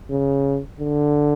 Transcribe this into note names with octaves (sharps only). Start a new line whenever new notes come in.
C#3
D3